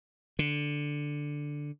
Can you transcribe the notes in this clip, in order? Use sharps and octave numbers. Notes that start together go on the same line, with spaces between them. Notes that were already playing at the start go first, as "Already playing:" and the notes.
D3